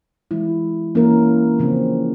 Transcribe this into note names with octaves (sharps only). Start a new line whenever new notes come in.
E3 G#3 E4
E3 A#3 C#4 E4 A#4
C#3 F3 C4